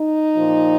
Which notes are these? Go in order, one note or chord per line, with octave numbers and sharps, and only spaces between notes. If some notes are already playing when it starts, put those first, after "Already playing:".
Already playing: D#4
A#2 F3